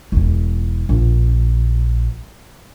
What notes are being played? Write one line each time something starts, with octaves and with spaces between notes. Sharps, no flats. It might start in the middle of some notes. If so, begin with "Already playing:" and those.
E1 E2
A#1